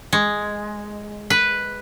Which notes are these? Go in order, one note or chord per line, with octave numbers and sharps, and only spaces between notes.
G#3
B4